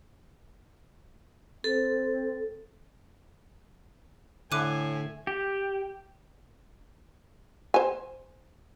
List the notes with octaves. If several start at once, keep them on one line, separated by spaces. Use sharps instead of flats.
C4 A4
A2 D3 E5 G#5 D6 F#6 D#7
G4
C5 G#5